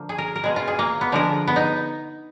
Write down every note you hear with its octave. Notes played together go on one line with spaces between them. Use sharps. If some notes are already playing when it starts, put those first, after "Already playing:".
Already playing: D3 F3 A#3
G#4
A#4
A#4
B2 G#3 G#4
F4
G#4
A#3
B3
D3 F3 G#3 A#4
B3
D#4